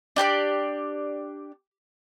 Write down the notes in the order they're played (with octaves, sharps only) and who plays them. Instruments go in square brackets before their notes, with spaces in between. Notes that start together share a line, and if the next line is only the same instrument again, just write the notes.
[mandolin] D4 G4 B4 D5